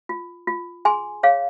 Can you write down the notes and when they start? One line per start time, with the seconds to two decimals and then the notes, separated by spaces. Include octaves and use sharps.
0.09 F4
0.48 F4
0.85 G#4 G#5 C6
1.23 G#4 C#5 F5